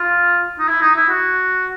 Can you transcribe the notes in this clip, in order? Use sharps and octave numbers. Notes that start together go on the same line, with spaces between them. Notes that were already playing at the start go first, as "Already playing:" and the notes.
Already playing: F4
D#4
E4
D#4
E4
F#4